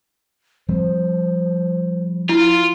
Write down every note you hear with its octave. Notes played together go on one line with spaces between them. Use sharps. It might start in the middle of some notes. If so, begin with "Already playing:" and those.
F3 G3 C4 C5
F3 E4 F4